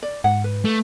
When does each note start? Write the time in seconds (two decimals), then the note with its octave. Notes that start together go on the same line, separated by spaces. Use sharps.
0.03 D5
0.24 G#2 F#5
0.44 B4
0.65 A3